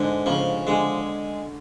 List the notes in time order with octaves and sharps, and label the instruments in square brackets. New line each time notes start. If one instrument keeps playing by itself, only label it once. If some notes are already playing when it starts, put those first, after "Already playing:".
Already playing: [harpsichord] G#2 [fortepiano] D3
[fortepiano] C#3 [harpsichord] F3
[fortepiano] D3 [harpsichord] G#3